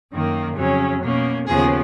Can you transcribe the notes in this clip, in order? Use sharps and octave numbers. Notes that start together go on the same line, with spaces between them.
F#2 D#3 A#3
F2 C#3 F#3 C#4
B2 A#3 C#4
D#2 C#3 F3 B3 G#4